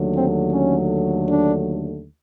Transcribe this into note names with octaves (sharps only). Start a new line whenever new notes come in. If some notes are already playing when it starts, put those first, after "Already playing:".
Already playing: D#2 D3 F#3 A3
C4
C#4
D4